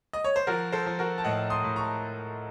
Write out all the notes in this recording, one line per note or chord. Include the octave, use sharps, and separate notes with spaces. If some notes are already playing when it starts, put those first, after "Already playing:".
D#5
C#5
C5
F3 F#4 A#4
A4 C5
F3
F#4 A#4
A5
A2 D#5 F#5
C6 D#6
A2
A#5 C#6